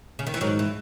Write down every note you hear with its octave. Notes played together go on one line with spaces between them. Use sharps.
C#3
D#3
E3
G#2 D#3 F#3
E3